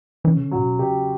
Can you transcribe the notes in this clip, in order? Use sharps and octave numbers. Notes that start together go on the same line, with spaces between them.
E3 C#4
C#3
D3
A2 F#3
B2
C#3 G4